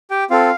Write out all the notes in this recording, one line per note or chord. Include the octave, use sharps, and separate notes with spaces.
G4 G5
C4 F4 A4 F5